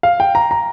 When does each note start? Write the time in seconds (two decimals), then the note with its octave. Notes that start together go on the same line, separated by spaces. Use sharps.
0.03 F5
0.20 G5
0.35 A#5
0.51 A#5